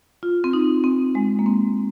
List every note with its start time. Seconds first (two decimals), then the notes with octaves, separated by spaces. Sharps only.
0.23 F4
0.44 C4
0.53 D#4
0.84 C4
1.15 G#3
1.39 A#3
1.46 C4